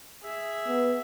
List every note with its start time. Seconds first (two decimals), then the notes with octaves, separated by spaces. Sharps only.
0.23 G#4 E5
0.67 B3